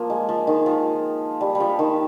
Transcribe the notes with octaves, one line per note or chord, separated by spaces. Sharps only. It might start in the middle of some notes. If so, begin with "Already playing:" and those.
Already playing: F3 A#3
G#3
F3
D#3
F3
G3
G3
F3
D#3